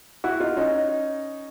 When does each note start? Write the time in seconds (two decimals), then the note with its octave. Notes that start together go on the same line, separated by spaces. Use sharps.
0.24 E4 F#4
0.40 D#4 F4
0.57 C#4 D#4